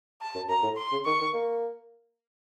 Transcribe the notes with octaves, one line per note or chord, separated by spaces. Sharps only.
A5
F#2
F#2 A#5
A2
C6
C#3
D#3 C#6
D#3
A#3